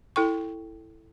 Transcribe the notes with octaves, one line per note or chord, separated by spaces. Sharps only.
E4 A4 G5 C#6